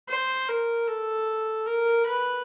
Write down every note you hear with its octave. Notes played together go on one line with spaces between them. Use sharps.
C5
A#4
A4
A#4
B4